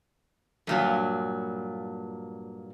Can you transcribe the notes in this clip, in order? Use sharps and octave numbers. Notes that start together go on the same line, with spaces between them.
G2 A#2 F#3